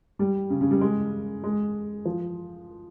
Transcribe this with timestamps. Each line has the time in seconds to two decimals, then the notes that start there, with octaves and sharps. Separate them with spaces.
0.19 G3
0.50 C#3
0.61 C#3
0.71 G3
0.81 G#3
1.44 G#3
2.05 F3